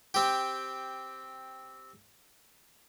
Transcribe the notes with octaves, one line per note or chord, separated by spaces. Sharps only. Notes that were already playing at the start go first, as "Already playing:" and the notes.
C4 G4